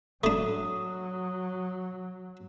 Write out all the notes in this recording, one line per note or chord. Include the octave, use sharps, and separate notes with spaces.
F#3 A3 D4 D#6